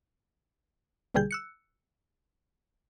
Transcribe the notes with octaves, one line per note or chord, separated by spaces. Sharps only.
A#1 B2 D3 G3 G#4 G6
E6 F#6 C#7